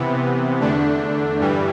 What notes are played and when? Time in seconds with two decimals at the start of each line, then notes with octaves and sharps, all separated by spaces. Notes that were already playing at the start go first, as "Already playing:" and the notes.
Already playing: C3 E3 B3
0.60 E2 D3 A3 D4
1.40 G2 E3 G3